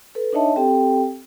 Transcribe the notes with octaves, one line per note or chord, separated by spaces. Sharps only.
A4 B4
D4 D#4 C#5 D#5 E5 A5
C4 G4 A4 G5